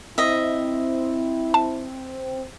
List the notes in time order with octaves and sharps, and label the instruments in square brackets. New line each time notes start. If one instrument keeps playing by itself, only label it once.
[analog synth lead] C4 [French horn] E4 [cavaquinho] D#5 E5
[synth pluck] A5